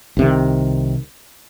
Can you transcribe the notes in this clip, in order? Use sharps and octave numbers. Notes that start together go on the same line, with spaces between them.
C2 C3 D#3